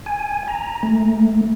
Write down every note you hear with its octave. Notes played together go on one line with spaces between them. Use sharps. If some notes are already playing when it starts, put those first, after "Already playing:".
G#5
A#5
A3